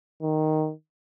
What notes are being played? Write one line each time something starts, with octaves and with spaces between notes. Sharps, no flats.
D#3